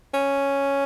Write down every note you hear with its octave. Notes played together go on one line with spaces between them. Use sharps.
C#4